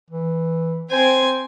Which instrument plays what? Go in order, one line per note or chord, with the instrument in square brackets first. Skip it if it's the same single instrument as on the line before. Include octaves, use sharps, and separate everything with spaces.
[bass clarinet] E3
[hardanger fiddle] C4 G#5 [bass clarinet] C5